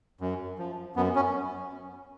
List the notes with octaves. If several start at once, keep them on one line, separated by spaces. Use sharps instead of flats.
F#2
F3
F#2 B3
C#4